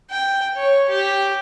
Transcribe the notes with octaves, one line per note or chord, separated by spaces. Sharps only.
G5
C#5
G4